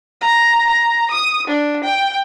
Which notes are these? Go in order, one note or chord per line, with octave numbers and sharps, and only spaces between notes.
A#5
A#5
D#6
D4
G5